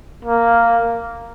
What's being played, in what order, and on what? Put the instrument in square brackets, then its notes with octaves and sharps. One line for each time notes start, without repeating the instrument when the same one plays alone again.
[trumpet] A#3